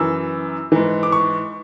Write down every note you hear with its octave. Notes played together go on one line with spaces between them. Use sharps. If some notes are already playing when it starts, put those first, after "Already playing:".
Already playing: F#2 E3 E6
G#2 E3
D6
C#6